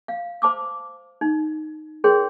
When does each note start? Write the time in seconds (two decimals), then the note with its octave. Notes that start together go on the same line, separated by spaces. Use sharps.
0.08 F5
0.42 C5 A5 D6 E6
1.21 D#4
2.04 G#4 A#4 C#5 G5 C6